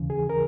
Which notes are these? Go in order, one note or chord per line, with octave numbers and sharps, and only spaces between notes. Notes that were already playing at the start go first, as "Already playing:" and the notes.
Already playing: D#2 C#3 E3
G#4
A#4